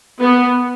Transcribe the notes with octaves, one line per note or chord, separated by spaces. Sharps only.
B3